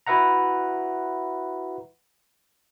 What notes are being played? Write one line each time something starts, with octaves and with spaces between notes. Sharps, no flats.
E4 F#4 B4 E5 F#5 A#5